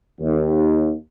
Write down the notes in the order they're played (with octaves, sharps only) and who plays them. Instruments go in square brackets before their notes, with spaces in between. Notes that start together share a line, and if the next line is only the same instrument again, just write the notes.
[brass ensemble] D#2